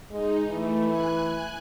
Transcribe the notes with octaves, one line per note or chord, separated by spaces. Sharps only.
G#3 D#4
E3 A3
G#5 F#6